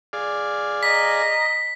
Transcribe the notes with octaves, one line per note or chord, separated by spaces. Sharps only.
G#4 D5 F5
D#5 A#5 B6